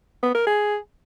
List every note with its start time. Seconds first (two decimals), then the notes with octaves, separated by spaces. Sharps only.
0.23 B3
0.35 A#4
0.47 G#4